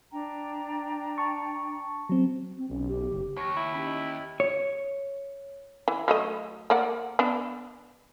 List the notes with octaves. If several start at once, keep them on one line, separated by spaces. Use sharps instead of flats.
D4 G5 A#5
A5 C#6
F#3 C4
C4
B1 C#4
G4
F#1
D#2 C#5 C#6 A#6
E4 B5
C#4 D#4 G4 B5
D#5
C#5
E3
F#3 A3 D#5
A#3 D5 F#5
B3 D4